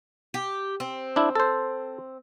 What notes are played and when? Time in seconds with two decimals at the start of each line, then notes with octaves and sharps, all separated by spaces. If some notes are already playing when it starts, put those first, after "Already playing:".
0.34 G4
0.80 C4
1.16 D4 E4
1.35 A4 C5